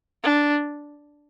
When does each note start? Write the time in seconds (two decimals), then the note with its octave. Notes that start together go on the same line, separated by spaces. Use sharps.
0.23 D4